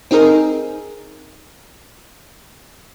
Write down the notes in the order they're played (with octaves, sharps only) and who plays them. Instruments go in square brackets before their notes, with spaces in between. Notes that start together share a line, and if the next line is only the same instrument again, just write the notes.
[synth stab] C4 D#4 G#4 A#4